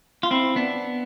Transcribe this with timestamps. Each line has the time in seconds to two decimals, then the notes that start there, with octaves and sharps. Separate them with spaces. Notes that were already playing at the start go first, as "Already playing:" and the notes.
0.23 F4
0.31 C4 E4
0.56 B3 D4